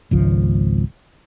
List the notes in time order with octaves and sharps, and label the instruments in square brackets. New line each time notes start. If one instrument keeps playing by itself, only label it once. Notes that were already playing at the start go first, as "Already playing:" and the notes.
[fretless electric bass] G#1 C#2 F3